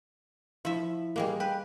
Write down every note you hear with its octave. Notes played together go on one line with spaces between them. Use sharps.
F3 E4 E5
G3 G#3 A#3
B4 G5